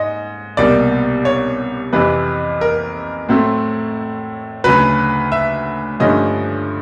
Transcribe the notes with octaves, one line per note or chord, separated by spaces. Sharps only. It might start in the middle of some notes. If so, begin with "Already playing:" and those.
Already playing: G#2 D#5
C2 B2 G3 A#3 D5
C#5
F2 C3 E3 B4
A#4
A2 F#3 A3 C4
D2 C#3 F#3 B4
E5
G2 D3 F3 A3 C#4 D#5